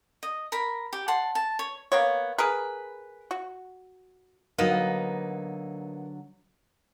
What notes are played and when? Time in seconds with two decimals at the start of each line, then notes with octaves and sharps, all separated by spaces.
0.23 D#5
0.52 A#4 B5
0.93 G4
1.08 F#5 A5 C6
1.35 A5
1.59 C#5
1.92 A#3 B3 C#5
2.38 G#4 A#4 B4
3.31 F#4
4.58 D3 F#3 A#3 B3 D#4